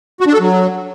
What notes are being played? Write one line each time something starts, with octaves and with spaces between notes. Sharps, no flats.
F#4
D4
A4
F#3